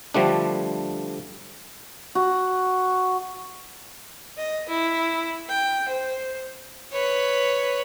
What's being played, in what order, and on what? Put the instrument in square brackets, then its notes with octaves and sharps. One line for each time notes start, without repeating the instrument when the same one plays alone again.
[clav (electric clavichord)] D3 F3 G3 A3 D4
[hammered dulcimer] F#4
[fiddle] D#5
E4
G5
C5
B4 C#5